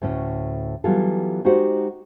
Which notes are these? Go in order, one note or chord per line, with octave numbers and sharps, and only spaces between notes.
D2 A2 C#4
E3 F#3 G3 B3 F4 A4
G#3 D#4 F#4 G4 C5 F#5